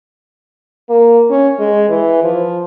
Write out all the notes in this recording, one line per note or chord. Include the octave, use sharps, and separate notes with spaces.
A#3
C#4
G#3
E3
F3